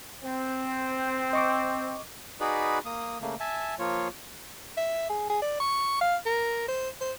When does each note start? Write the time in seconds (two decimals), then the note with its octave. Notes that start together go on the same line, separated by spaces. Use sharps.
0.24 C4
1.33 D#5 C#6 D6
2.40 D#4 F#4 G#4 B4 D5 B5
2.86 A#3 D#6
3.21 C#3 A3 A#3
3.40 E5 G#5 A5
3.79 F3 A#3 F4 C#5
4.77 E5
5.09 G#4
5.30 G#4
5.42 D5
5.60 C#6
6.01 F5
6.26 A#4
6.68 C5
7.01 C5